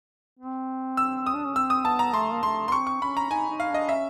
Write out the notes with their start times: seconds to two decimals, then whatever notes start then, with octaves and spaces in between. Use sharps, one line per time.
0.39 C4
0.97 E6
1.26 D#6
1.35 D4
1.45 C#4
1.55 C4 E6
1.70 D#6
1.85 B3 A5
1.99 A#5
2.14 A3 C6
2.33 A#3
2.43 A3 C6
2.68 C6
2.72 C4 C#6
2.87 C#6
3.02 C#4 B5
3.17 A#5
3.30 D#4 G#5
3.49 D#4
3.60 F5
3.70 D4 D#5
3.89 C#4 E5